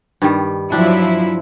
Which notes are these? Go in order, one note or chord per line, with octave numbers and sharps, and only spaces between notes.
G2 D#3 G3
F3 F#3 D4 E4 G4